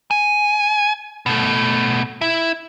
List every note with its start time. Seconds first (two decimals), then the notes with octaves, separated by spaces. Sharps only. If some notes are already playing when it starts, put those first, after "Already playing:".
0.11 G#5
1.26 B2 A3
2.21 E4